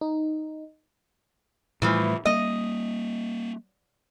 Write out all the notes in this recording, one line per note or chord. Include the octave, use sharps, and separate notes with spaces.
D#4
E2 A2 E3 F3 G3 A3
G3 A#3 D#5